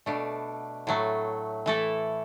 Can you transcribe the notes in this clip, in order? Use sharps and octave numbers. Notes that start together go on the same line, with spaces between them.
B2 A3 D4
A2 F#3 A3
E3 A3 E4 A4